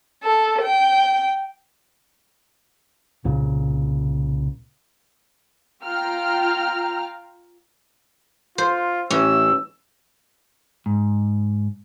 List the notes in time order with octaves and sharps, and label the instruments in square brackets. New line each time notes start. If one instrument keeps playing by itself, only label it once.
[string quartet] A4
G5
[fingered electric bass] C2 A#2 C#3
[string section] F4 F5 G5 A#5 F6
[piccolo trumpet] F4 [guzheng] C5
[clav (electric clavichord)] A1 E3 [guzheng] C#4 [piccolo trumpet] E6
[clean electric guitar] G#2